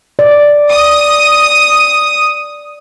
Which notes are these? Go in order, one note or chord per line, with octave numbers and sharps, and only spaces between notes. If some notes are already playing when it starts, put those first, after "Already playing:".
D5
D#6